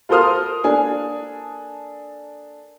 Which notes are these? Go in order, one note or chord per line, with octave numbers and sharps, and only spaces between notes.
F4 A4 A#4 C5 D#6 F6
A#3 D4 A4 G#5